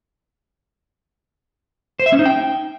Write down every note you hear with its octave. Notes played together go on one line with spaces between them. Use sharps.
C5
E5
C#4
D#4
G5